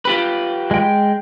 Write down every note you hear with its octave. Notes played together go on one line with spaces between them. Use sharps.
F4 G4 B4
G#3 G5